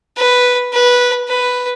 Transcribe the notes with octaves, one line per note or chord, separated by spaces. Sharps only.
B4
B4
B4